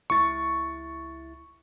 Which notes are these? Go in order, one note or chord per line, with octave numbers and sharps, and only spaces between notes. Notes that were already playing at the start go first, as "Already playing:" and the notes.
C#2 E4 C#6 A6